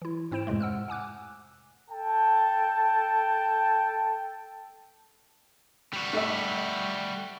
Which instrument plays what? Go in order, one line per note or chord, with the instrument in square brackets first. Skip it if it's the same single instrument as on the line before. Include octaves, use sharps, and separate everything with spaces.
[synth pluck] E3 E4
G#2 C4 E4 C5 D7 E7
F2 A2 C3 G#3 A3
F#5 E6 F6
F#5 G#5 D6 F#6
[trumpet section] A4 G5 A5
[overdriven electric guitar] G3 F#4
[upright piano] A3 E5